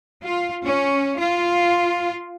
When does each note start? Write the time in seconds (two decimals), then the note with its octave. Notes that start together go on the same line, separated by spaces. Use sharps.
0.24 F4
0.64 C#4
1.18 F4